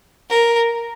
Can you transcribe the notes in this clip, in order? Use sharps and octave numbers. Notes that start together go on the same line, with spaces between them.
A#4